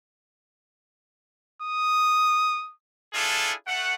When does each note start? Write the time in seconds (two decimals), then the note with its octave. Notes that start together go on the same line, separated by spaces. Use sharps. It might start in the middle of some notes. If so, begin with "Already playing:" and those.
1.62 D#6
3.13 D4 E4 F4 G#4 A4
3.66 A3 F#5